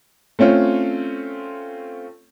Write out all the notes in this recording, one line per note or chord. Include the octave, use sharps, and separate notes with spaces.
A3 C4 C#4 F4